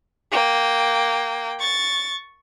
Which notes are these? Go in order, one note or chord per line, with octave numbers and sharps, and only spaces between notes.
A#3 G5
C#6 A6